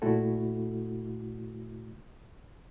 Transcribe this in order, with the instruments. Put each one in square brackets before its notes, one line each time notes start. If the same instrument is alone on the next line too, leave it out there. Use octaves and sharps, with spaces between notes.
[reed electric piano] A#2 A3 E4 F#4 A4